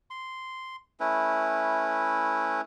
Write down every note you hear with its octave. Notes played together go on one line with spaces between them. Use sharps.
C6
A3 C#4 E4 B4